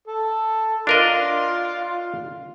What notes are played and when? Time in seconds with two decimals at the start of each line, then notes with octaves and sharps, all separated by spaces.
0.07 A4
0.87 D4 F4 A#4 D#5 F5 C6